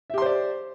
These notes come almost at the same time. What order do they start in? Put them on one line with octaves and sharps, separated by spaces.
E5 G4 C6 C5 D5